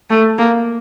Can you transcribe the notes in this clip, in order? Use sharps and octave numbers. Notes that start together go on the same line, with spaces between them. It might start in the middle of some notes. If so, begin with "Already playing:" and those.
A3
A#3